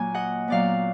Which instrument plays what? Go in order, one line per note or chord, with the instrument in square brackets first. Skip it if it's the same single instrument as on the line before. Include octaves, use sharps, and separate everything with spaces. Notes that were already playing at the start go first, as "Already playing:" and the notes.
Already playing: [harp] A#2 F#3 A#3 G#5
D#5 F#5
A#2 F#3 B3 D5 F5